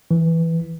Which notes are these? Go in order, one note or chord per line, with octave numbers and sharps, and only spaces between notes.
E3